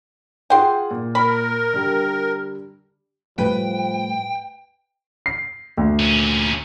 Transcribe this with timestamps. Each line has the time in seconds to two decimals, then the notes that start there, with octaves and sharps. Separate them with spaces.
0.50 F4 G#4 F#5 G5 C6
0.91 A#2
1.15 A#4 B5
1.73 D3 G3
3.38 A2 F3 G3 A3 B4 G5
5.26 C7
5.77 D2
5.99 A#2 C#4